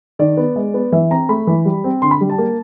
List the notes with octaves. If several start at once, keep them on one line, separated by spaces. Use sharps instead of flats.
D#3 D5
B3
G#3
B3
E3 E5
C4 A#5
A3 B5
E3
G3
C4
D3 C6
B5
G3
A5
A#3